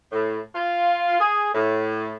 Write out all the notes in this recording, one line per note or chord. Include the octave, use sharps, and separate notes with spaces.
A2
F4
G#4
A2